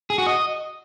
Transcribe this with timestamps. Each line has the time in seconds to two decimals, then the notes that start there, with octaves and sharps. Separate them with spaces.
0.10 G#4
0.18 F#4
0.27 D#5